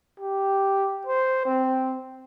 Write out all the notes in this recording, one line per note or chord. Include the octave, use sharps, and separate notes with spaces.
G4
C5
C4